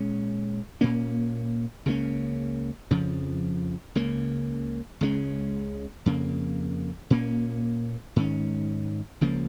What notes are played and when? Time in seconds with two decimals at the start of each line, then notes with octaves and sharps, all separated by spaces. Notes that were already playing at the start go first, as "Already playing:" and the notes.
Already playing: A#2 G#3 C#4
0.81 A#2 A#3 C#4
1.86 C#2 C#3 A#3 C#4
2.91 F2 C#3 F3
3.95 C#2 C#3 A#3
5.01 C#2 C#3 G#3 C#4
6.06 F2 C#3 A#3
7.10 A#2 A#3 C#4
8.16 G#2 D#3 C#4
9.21 C#2 C#3 F3 A#3